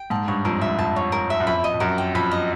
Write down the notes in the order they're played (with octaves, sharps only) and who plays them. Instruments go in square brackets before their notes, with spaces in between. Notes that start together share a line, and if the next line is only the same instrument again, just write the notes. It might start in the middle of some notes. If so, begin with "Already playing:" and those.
Already playing: [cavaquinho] G5
[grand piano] G#2 [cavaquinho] A5
[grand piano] G2 [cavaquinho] C#5
[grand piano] F2 [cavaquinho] A#4
[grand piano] F2 [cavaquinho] E5
[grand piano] F2 [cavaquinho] A5
[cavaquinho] C#5
A#4
E5
[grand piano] F#2
[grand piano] F2 [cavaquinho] B5
[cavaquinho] D#5
[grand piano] F2
[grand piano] F#2 [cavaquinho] A#4
[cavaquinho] G5
[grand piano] F2 [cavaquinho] B5
[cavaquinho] D#5